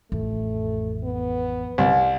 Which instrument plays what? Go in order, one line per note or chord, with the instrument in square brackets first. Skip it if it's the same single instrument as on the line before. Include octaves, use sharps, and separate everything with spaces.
[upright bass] A1 F2 [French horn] A3
[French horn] B3
[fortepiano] C2